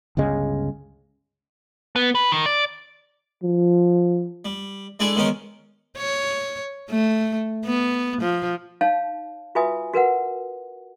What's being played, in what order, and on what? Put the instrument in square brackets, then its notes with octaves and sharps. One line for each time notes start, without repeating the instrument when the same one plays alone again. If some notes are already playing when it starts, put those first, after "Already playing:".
[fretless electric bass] G1 C#2 C#3 G#3
[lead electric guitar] B3
B4
D#3
D5
[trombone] F3
[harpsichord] G3
G#3 D4 E4 G#4 A4 D5
D#3 G#3 B3 C#4 D#4 A#4
[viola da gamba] C#5
A3
B3
F3
[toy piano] D#4 C#5 F5 A5
F4 F#4 B4 E5 G#5 D#6
F#4 A#4 B4 F#5